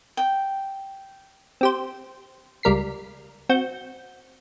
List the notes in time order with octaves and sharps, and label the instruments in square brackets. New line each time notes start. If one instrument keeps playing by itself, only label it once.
[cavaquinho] G5
[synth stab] C4 G4 C5
C#2 G3 A#4 B6 C7
C4 F#4 G6